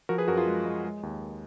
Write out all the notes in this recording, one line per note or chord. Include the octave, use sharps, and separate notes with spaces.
F3 F#4 A#4
G#4 B4
F#2 F#4 A#4
F4 G#4
G#3
G#3
G#3
D#2